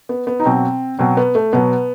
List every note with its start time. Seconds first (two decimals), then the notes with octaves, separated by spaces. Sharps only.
0.09 B3
0.27 B3
0.40 D#4
0.45 B2 F#3 C4
0.99 B2 F#3 C4
1.17 B3
1.35 A3
1.53 B2 F#3 B3